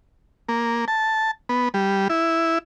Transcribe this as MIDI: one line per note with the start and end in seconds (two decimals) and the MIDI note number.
0.49 0.85 58
0.88 1.31 81
1.49 1.69 59
1.74 2.08 55
2.10 2.58 64